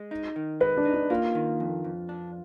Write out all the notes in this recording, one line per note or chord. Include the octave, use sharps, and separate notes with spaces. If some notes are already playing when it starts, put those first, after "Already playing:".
Already playing: G#3
D#4
D#3
G#3 B4
D4
D#4
D4
A#3 F4
D#3
F2
F2
D4